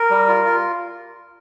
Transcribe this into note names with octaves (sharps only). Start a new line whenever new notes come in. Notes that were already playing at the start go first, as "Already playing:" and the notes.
Already playing: A#4
G3
F4
F4